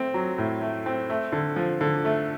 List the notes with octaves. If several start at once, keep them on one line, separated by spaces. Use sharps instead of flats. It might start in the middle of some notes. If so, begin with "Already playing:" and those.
Already playing: A3 C4
F#3
A2
A3
C4
A3
D3
F3
D3
A3